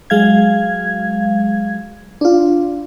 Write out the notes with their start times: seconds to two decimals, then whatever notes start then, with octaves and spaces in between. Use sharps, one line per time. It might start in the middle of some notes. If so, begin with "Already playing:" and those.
0.10 F#3 G#3 F5 G#6
2.21 D4 F4